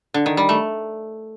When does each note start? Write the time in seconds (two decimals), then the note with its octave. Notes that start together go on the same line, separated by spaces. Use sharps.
0.14 D3
0.26 D#3
0.37 G3
0.49 A3